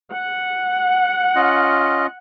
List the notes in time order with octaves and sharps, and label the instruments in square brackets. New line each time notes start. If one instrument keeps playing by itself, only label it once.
[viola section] F#5
[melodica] C#4 F4 D#5